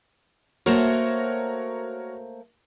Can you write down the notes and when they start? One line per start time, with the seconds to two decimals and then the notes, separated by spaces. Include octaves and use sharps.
0.66 A3 A#3 F#4 A#4 C5 C#5